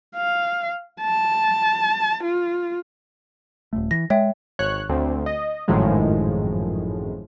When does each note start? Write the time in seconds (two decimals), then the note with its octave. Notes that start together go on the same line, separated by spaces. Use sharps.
0.15 F5
1.01 A5
2.24 F4
3.73 D#1 G#1 A3
3.91 E3 A#6
4.10 G#3 C#5 E5 G5
4.59 G#1 C#5 F#6
4.89 D2 C4
5.26 D#5
5.68 G#1 F#2 A2 D#3 F3 G#3